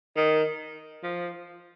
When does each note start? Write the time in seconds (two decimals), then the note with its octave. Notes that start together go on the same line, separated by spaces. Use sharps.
0.16 D#3
1.03 F3